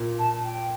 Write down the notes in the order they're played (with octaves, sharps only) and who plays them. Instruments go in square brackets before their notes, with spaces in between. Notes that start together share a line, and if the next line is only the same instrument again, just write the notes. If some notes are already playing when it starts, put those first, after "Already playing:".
Already playing: [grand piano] A#2
[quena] A5
G5